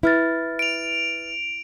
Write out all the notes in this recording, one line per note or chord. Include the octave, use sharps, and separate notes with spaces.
E4 B4 F6 A6
D7 F7